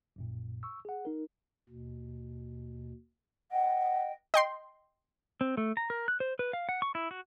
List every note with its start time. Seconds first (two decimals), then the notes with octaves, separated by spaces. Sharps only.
0.16 A#1 F#2 A#2
0.63 C#6 E6
0.85 G#4 F#5
1.05 D#4 A#4
1.69 D#2 B2
3.52 D#5 F#5 G5
4.34 D#5 G5 C6
5.41 C4
5.57 A3
5.77 A#5
5.90 A#4
6.08 F#6
6.20 C5
6.39 B4
6.53 F5
6.69 F#5
6.82 C#6
6.95 E4
7.11 F#4